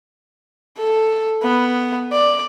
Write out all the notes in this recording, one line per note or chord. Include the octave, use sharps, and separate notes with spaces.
A4
B3
D5